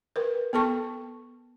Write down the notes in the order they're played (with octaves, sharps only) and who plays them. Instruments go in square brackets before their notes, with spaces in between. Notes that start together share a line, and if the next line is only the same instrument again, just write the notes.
[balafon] A#4 B4
B3 A4 A5 C#6